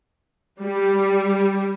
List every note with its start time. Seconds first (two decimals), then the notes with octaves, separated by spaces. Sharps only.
0.62 G3